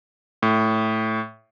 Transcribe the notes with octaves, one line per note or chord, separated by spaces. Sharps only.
A2